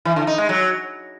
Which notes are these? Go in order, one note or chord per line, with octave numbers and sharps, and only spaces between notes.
E3
D3
D#4
G#3
F#3